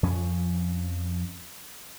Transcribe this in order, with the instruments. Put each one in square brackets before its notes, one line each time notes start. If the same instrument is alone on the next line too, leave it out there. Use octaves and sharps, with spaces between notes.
[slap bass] F2 F3 C#4